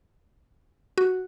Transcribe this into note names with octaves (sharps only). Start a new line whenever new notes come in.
F#4